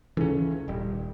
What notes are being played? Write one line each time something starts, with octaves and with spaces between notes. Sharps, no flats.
C#2 E3 C#4 A4
D#1 G3